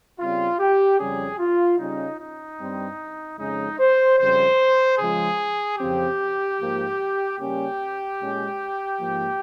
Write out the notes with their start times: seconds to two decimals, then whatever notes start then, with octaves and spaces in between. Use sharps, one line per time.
0.19 C#3 G3 C4 F4
0.59 G4
0.99 F2 C#3 G3 C#4 G#4
1.39 F4
1.79 C#3 G3 C#4 D#4
2.19 D#4
2.59 G2 G3 C4
3.39 F2 C#3 G#3 C#4 D#4
3.79 C5
4.19 F2 C#3 G3 C5
4.99 C#3 F3 G#3 G#4
5.79 F2 C#3 F3 C4 G4
6.59 G#2 F3 A#3
7.38 C#3 G3 A#3 C#4 G4
8.19 A#2 G#3 C#4
8.99 G#2 F3 A#3